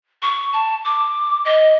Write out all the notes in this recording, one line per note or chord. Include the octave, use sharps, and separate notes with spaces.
C#6
A5
D6
D#5